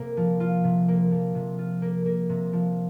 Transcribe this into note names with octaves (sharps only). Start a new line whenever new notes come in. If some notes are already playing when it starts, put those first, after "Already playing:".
Already playing: C3 A#3 F4
F3
F4
C3
A#3
F3
C3
F4
A#3
A#3
C3
F3